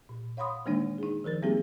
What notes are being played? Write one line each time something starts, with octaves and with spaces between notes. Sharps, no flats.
A#2
C#5 F5 F#5 B5 C6 D#6
D#3 E3 G#3 A#3 D4 D#4
D#4 G#4
D#3 F3 A#4 A6
G3 A#3 C4 D#4 G4 G#4